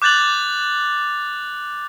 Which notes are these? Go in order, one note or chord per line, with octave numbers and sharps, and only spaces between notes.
D6 F#6 G6 A6 F7 F#7